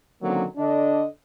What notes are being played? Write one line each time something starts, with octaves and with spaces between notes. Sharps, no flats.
D3 D#3 F#3 A#3 C4 C#4
D3 D4 D#5